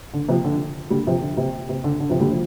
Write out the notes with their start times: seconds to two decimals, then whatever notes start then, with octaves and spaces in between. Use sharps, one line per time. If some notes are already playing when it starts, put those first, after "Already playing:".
0.14 D3
0.28 C3 F3
0.45 D3
0.90 D3 G3
1.07 C3 F3
1.22 D3
1.37 C3
1.69 C3
1.84 D3
2.00 D3
2.10 C3 F3
2.20 D3 G3
2.31 F3